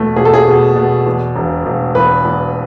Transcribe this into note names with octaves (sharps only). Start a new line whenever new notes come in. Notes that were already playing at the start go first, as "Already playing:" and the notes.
Already playing: E2 B2 A3
B2 G#4
A4
G#4
B2
B2
E2
E1
E1
E2 B4
E2